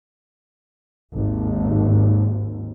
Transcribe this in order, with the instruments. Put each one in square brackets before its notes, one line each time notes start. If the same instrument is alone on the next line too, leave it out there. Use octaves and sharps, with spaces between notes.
[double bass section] G#1 D#2